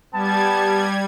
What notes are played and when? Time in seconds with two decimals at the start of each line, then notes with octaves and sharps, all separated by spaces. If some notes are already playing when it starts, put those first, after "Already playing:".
0.13 G3 B3 A5 G#6